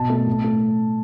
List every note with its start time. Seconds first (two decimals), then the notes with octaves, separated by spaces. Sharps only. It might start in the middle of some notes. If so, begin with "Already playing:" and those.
Already playing: B2 A5
0.10 A3
0.27 A2
0.44 A3